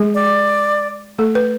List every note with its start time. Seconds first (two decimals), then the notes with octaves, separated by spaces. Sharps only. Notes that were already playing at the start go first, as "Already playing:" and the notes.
Already playing: G#3 G#4
0.14 D5
1.19 A3 A4
1.35 B4